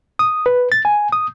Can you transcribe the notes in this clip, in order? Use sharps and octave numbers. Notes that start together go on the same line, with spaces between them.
D#6
B4
A6
G#5
D#6